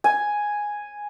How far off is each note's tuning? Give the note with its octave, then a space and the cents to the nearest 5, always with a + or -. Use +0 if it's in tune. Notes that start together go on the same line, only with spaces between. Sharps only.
G#5 +0